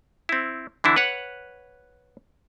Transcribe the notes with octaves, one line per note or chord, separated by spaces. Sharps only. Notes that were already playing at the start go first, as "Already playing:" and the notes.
C4 E4
D3 E3 D4 E4
B4 C#5 F#5